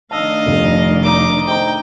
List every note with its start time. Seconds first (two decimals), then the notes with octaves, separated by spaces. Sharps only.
0.11 D#3 A3 D4 D#5 F5 A5 E6
0.46 F1
1.03 D#4 D6
1.48 C5 D#5 G5 A#5